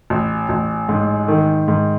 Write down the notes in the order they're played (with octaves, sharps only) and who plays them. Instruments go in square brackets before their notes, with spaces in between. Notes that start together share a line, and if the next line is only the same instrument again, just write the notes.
[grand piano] A1
A1
G#2
D#3
G#2